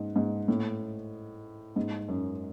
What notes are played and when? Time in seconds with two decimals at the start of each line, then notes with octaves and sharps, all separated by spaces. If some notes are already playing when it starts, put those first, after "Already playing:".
Already playing: G#2
0.16 G#2
0.48 A2
1.76 G#2
2.08 F#2